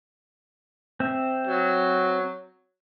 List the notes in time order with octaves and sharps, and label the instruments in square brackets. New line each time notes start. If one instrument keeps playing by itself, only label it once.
[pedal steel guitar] C4 E5
[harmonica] F#3